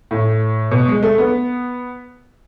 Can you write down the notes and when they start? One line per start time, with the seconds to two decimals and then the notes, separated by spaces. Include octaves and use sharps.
0.11 A2
0.71 B2
0.88 G#3
1.03 A3
1.18 B3